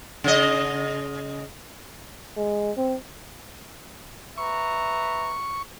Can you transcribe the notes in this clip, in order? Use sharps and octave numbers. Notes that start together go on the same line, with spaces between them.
C#3 D#5
G#3
C4
B4 E5 A#5 C#6